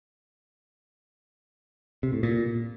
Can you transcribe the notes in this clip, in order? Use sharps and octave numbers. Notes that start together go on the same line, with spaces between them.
C3
A2
A#2